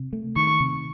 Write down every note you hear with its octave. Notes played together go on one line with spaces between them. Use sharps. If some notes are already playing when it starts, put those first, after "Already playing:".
Already playing: C3
A3
D#3 C#6
C3